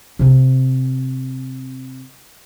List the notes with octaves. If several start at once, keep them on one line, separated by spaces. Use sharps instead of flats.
C3 C4